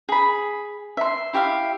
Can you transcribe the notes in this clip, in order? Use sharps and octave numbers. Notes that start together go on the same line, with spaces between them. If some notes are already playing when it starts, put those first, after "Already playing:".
G#4 B5
E5 C6
E4 G4 E5 F5